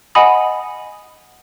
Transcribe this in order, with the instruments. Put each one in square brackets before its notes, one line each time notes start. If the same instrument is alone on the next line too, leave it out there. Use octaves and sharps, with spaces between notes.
[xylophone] D#5 F#5 G#5 B5 D#6